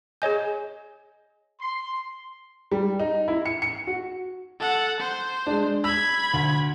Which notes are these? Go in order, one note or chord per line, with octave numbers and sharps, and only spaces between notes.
G#4 C#5 D#5 G#5 G6
C6
G3
D#4
E4
C#7
C#7
F#4
A4 F#5
C5
G#3 D4
B5 E6 G#6
D2